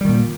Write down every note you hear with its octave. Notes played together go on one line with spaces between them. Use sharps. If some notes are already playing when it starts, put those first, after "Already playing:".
A#2 D#3 G3